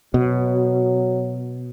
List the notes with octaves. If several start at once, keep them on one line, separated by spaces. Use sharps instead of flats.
B2 F#3